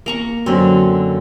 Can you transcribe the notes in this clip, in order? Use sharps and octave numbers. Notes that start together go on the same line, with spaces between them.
A#3 A#5 C#6
F#2 D3 C4